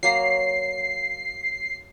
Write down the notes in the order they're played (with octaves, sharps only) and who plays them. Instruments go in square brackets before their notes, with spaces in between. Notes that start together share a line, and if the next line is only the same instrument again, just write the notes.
[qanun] F#3 A#3 A#5 [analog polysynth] C7